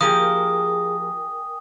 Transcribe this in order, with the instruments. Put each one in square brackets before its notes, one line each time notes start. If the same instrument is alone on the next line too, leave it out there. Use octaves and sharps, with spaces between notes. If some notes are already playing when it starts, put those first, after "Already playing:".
[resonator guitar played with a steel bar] F3 A#3 G4 [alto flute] G#4 [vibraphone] A#4 G5 G#5 [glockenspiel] D#6